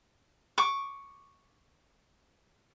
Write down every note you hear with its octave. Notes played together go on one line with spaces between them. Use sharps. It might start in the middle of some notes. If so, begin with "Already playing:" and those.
C#6 D6